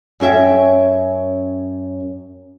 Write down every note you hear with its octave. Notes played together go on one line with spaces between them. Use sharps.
F#2 C#4 F4 E5 G5